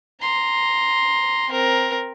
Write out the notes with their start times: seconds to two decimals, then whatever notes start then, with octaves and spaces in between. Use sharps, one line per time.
0.21 A#5 C6
1.50 C4 A#4